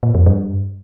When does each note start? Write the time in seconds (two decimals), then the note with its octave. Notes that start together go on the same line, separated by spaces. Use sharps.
0.03 A#2
0.15 F2
0.26 G2